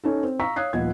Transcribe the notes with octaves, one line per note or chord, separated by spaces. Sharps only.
C#4 D#4 A4
C4
F5 A#5 C#6 E6 B6
C#5 F5 D#6 F#6 G#6 C7
D#1 F3 B3 D#5 G#6